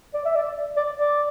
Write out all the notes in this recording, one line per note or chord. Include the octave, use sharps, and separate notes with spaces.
D5
E5
D5
D5
D5